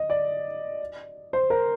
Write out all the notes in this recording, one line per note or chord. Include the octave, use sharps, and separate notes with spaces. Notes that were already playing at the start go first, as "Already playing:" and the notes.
Already playing: D#5
D5
C5
A#4